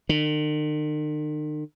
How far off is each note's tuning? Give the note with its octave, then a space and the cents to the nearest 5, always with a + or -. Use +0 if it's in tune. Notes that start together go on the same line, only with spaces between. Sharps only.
D#3 -45